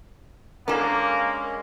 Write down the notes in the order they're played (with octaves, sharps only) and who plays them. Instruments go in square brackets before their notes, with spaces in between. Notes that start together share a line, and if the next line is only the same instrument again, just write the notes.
[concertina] G#3 C#4 [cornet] A#3 [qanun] D4 A4 [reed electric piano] A#4